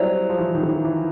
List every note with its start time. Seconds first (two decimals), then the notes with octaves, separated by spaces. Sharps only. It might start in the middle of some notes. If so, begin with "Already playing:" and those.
Already playing: F#3 G3 C4 E4
0.29 F3
0.38 E3
0.55 D#3
0.68 E3
0.85 E3